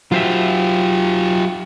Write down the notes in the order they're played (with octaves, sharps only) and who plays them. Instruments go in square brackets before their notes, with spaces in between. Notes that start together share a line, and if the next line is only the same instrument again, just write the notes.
[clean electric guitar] F#3 C5 E5 [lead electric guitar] F4 G4